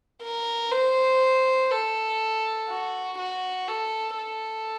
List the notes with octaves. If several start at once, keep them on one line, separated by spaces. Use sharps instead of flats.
A#4
C5
A4
F#4
F#4
A4
A4